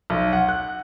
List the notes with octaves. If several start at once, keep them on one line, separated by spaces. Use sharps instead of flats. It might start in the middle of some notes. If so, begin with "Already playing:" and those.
B1
F#5
F#6